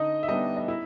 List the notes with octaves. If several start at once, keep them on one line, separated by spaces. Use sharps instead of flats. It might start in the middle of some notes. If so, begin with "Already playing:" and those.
Already playing: D3 D#4 D#5
E5
G3 B3 D4 D#4 D#5
D#5
E4 E5